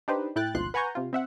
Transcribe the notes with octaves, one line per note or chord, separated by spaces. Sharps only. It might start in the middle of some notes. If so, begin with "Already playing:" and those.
D4 D#4 G4 B4 C5
A2 E4 G5 F#6 A6
G#1 D2 B2 F3 C6 F#6
B4 F#5 G#5 A#5 C#6 G6
C3 F4
C4 E5 F#5